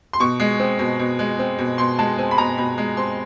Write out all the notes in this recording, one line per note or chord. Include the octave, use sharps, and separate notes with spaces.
C6
B2 C#6
G#3
C4
B2
B2
G#3
C4
B2
B2 C6
G#3 A5
C4 G#5
B5
B2 A#5
B2 B5
G#3
C4 C6